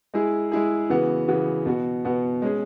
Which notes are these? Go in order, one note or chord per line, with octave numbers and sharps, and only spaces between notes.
G#3 E4 G#4
G#3 E4 G#4
C#3 E3 B3 F#4
C#3 E3 B3 F#4
B2 B3 F#4
B2 B3 F#4
G#3 C#4 G#4